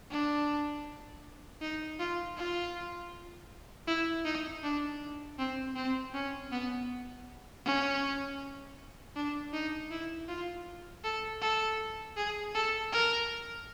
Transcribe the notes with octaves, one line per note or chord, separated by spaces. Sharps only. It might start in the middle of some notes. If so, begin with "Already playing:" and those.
D4
D#4
F4
F4
E4
D#4
D4
C4
C4
C#4
B3
C#4
D4
D#4
E4
F4
A4
A4
G#4
A4
A#4